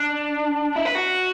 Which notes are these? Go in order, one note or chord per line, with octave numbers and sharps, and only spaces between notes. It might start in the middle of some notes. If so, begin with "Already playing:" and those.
Already playing: D4
E4
B4
F#4